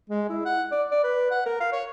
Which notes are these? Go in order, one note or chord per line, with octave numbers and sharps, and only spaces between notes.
G#3
E4
F#5
D5
D5
B4
F#5
A#4
F5
C#5